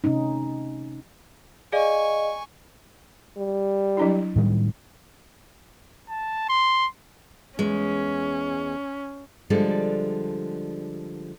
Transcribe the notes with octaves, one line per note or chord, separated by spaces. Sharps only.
C3 A3 C#4 D#4
G#4 D5 D#5 F5 G#5 C#6
G3
F#3 D4 E4
A2 D#3 G3
A5
C6
E2 G#3 C#4
D3 F3 G3 G#3 D4 A4